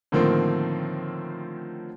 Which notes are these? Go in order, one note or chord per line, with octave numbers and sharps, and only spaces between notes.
A2 D3 D#3 F3 A#3 C4